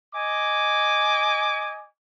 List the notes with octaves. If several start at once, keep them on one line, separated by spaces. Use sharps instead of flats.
D#5 G#5 D6